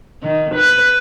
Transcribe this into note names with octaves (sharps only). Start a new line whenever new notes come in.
D#3
B4